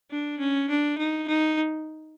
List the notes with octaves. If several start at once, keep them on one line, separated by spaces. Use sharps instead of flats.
D4
C#4
D4
D#4
D#4